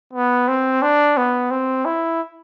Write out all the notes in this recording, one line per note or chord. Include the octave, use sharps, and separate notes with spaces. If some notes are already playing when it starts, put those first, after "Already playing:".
B3
C4
D4
B3
C4
E4